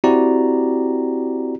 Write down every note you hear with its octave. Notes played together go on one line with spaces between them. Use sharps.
C4 E4 F#4 G4 D5 A#5